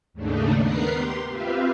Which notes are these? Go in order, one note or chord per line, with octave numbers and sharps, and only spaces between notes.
D#2 G#2 C#3 A3 D4 D#4
B3 A#4 B4 A#5 C7
G4 C6
C4 F4 G4 B4 E5 F5